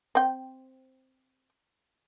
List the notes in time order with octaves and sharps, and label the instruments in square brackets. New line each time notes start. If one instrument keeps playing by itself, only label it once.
[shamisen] C4 G5